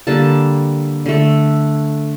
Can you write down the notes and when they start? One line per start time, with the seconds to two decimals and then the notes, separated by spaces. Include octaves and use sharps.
0.07 D3 G3 A#3 A5
1.06 D3 A3